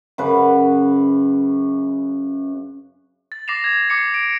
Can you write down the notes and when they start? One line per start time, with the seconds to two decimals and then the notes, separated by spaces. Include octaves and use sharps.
0.18 F#2 C#3 B4
3.32 A6
3.48 D6 A#6 C7 E7 F7
3.64 G#6 A#6
3.90 D6 C7 C#7
4.14 D7